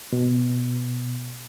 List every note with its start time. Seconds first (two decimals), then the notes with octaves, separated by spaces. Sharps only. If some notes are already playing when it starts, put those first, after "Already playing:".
0.13 B2